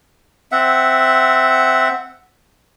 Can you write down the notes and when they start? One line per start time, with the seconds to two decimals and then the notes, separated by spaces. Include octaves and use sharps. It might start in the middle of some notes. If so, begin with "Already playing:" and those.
0.52 C4 E5 F#5